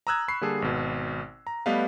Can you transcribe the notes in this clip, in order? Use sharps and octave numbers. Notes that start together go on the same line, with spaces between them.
A#5 D#6 E6 F#6 G#6
B5 C#6 C7
D3 G3 A#3 G#4 A4
G#1 B2
A#5
G3 A3 B3 B4 D#5 F5